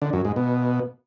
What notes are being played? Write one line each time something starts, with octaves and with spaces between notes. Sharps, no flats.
D3
F#2
G#2
B2